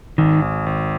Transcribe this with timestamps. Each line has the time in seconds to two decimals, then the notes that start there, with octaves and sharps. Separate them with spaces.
0.18 G#1 D#3
0.42 G#1
0.66 G#1